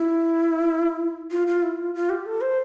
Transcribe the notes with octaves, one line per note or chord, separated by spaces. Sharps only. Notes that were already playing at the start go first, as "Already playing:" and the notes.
Already playing: E4
F4
F4
E4
F4
F4
G4
A4
C5